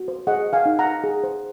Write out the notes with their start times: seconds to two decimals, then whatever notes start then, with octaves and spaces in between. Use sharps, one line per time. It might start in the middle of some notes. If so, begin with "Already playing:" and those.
Already playing: F#4
0.08 C5
0.27 G#4 D#5 F#5
0.46 C5
0.53 F5 G#5
0.66 D#4
0.79 F#5 A#5
0.85 D#4
1.04 G#4
1.24 C5